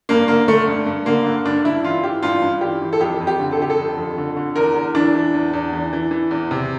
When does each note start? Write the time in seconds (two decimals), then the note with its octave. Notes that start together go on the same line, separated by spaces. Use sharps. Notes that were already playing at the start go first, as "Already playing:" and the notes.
0.09 G2 A#3
0.28 D3 A#3
0.48 D3 A3
0.68 G2
0.87 G2
1.06 D3 A#3
1.26 D3
1.45 G2 D4
1.64 G2 E4
1.84 E3 F4
2.03 E3 G4
2.23 G2 F4
2.42 G2
2.61 E3 G4
2.81 E3
2.93 A4
3.00 F2 G4
3.20 F2
3.27 G4
3.40 D3
3.52 A4
3.59 D3 G4
3.70 A4
3.78 F2
3.98 F2
4.17 D3
4.37 D3
4.56 E2 A#4
4.75 E2
4.95 E3 D4
5.15 E3
5.34 E2
5.53 E2
5.73 E3
5.93 E3
6.11 E3
6.31 E2
6.51 C3